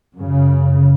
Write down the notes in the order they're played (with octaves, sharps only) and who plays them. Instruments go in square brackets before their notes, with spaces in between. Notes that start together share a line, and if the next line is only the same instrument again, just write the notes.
[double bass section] F#2 C#3